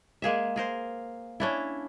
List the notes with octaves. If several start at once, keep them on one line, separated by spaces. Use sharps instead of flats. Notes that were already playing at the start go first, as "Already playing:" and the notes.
G#3 A#3 G#4 E5
G#4 A#4 C5
C#4 D4 E4